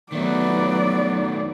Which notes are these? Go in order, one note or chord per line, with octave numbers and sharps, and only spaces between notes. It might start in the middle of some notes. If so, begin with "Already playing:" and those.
D#3 F#3 A3 B3 D5